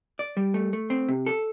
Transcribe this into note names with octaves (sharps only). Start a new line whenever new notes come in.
D5
G3
A3
A3
C4
C3
A4